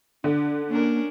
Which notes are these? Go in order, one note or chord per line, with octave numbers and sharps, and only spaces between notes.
D3 D4
A#3 C#4 D4 A#4